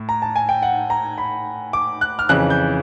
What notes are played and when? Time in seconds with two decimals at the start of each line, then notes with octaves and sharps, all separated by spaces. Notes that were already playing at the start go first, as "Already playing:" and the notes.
Already playing: A2
0.09 A#5
0.22 A5
0.36 G#5
0.49 G5
0.62 F#5
0.90 A#5
1.18 B5
1.73 D6
2.01 F#6
2.19 F6
2.29 F2 C#3 E3 F#6
2.50 G6